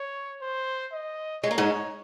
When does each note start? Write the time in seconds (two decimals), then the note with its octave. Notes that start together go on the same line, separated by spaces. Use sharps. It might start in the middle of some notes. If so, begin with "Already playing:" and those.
Already playing: C#5
0.42 C5
0.93 D#5
1.44 G#3 C#5
1.51 A#3
1.58 G#2 G#3